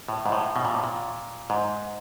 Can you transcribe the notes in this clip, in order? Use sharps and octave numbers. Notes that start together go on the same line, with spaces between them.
A2
G#2
A2
B2
A#2
A2
A#2
G#2